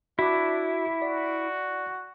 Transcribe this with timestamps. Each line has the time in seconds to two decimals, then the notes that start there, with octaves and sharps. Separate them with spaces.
0.19 D4 E4 F#4 D6
1.02 F#4 D5